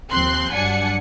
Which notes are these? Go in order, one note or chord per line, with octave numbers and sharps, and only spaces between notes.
D#2 F3 C4 C6 F#6
G2 F#3 D4 F#5 G#5 C#7